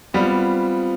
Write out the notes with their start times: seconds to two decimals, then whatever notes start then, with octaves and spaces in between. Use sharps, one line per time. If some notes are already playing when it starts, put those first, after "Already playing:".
0.13 G3 B3 C4 F4 C5 F5